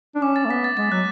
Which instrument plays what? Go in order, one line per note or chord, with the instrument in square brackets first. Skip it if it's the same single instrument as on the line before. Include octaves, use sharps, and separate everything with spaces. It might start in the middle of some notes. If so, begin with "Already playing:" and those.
[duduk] D4
[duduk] C#4 [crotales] D6
[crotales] A6
[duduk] A3
[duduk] B3 [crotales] B6
[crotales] A6
[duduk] G#3 [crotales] A6
[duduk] F#3 [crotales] F#6